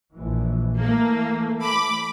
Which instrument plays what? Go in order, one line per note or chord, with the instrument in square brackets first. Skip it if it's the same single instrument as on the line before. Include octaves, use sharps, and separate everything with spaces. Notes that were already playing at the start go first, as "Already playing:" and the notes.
[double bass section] A#1 E3
[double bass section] E3 A3 [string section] A#3
[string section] B5 D6